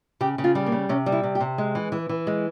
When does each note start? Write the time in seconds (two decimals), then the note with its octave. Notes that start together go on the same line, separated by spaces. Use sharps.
0.21 C#3 G4
0.38 C#3
0.44 F4
0.55 G3
0.66 A#3
0.72 C#3
0.89 C3 C#4
1.06 G3
1.12 E4
1.23 C3
1.35 G4
1.40 C3
1.58 G#3
1.75 E3
1.92 E3
2.09 E3
2.27 G#3